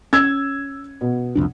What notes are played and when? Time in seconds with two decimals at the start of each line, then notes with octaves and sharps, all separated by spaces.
0.13 C#4 E6 G#6
1.01 B2
1.35 C2 F2 D4